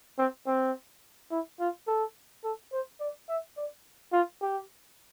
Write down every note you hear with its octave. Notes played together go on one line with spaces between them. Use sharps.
C4
C4
E4
F4
A4
A4
C5
D5
E5
D5
F4
G4